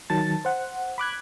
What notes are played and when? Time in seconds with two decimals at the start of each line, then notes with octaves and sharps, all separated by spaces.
0.10 D#3 F#3 A5 A6
0.45 C5 F#5
0.98 B5 D6 F#6 G#6